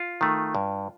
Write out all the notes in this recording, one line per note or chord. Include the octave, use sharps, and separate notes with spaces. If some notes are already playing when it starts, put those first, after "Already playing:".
Already playing: F4
D#3 A3
G2